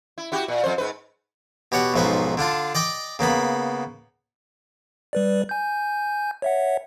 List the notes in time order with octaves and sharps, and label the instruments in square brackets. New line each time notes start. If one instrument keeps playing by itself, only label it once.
[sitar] E4
E4 F#4 G4
A#2
F2 C5
G#2 B4
[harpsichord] B2 G4 C#5 F#5
B1 G#2 F3 C#4 B4 C5
D3 D4 F4 A5
D5 D#5 G5 D6
C#3 A#3 B3 B5
[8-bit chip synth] G3 B4 D5
G#5 G6
C#5 E5 F#5